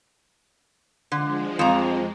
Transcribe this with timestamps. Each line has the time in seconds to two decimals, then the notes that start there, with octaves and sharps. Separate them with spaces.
1.12 D3 F3 G#3
1.59 F2 A#5